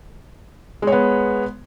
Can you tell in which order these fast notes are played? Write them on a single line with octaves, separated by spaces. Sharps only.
G#3 C#5 B3